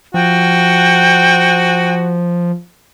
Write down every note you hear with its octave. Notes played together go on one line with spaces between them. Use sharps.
F3 F#4 G5